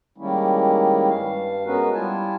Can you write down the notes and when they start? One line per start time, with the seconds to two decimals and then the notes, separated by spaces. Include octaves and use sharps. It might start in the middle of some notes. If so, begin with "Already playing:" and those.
0.18 D#3 G3 G#3 A#3 C#4 E4
1.10 G2 F5
1.65 G#3 B3 C#4 F#4 A#4 B4
1.94 G3 E4 F4 G#5 A5